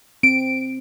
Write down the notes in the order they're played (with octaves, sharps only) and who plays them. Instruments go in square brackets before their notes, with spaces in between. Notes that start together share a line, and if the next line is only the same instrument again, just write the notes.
[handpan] C4 [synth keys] D7